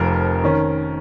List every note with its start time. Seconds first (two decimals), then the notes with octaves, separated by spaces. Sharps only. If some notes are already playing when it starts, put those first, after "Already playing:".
Already playing: F1 F2 F3 A#4
0.44 D#3 C#4